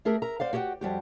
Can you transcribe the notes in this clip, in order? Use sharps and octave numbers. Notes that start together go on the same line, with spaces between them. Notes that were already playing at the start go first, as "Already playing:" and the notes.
A3 G4 G#4 A#4 E5
A#4 E5 A#5
C5 D5 F5 F#5
F#4 G4 C#5 D#5 F#5 G5
F2 G3 F#4 G4